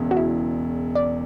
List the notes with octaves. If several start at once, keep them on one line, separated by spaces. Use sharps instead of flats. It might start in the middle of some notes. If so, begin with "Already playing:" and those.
Already playing: E1 E2 C#3
F#4
E4
D5